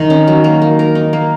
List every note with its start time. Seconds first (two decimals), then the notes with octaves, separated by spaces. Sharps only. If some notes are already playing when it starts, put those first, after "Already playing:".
Already playing: D#3
0.10 C#4
0.28 F#3
0.44 A#3
0.62 A#3
0.79 A#4
0.95 D#4
1.13 A#3